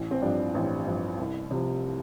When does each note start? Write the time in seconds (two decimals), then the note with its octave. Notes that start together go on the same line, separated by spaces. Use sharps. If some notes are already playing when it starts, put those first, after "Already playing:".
Already playing: A1
0.11 C4
0.22 G2 F3 D4
0.55 A1 C4
0.87 G2 F3
1.18 C2
1.51 C3 F3